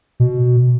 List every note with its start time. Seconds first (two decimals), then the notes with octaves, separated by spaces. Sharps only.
0.20 B2